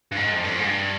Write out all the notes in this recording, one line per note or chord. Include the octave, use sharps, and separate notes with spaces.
G2
G#2
F2
G2
F2
G#2
G2